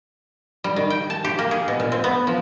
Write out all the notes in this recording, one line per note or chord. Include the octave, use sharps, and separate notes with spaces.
G3
D#3
G5
A5
G4
A#3
G#4
B2
A#2
C4
B3
F3